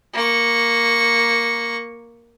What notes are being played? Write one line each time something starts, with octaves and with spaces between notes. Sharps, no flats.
A#3 C#6